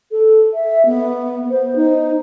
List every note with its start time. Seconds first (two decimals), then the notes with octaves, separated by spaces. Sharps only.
0.12 A4
0.54 E5
0.86 B3
1.50 C5
1.76 D#4